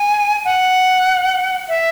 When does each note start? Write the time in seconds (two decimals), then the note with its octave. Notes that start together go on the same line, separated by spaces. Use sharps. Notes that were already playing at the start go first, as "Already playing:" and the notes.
Already playing: G#5
0.45 F#5
1.69 E5